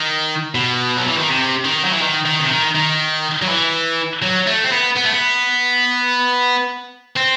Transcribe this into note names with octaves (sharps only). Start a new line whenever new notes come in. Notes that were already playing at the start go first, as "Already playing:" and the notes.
Already playing: D#3
B2
F#3
E3
D#3
C3
D#3
F#3
E3
D#3
D#3
C3
D#3
D#3
F#3
E3
F#3
A3
C4
B3
B3
A3
B3
C4